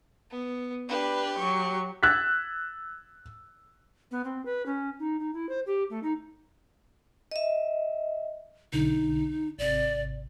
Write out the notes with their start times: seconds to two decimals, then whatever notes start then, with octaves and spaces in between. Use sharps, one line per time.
0.31 B3
0.89 D4 G4 B4
1.39 F#3 C#6
2.03 E6 F#6 G#6 A6 B6
4.11 B3
4.25 C4
4.46 B4
4.66 C#4
4.99 D#4
5.20 D#4
5.34 E4
5.49 C5
5.66 G4
5.90 A3
6.03 D#4
7.31 D#5 E5
8.73 B1 D3 D#4
9.59 G#1 C3 D5